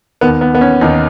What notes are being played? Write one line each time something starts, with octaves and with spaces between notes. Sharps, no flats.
D#2 D#3 B3
B3
B3
C#4
D#2 D#3 D#4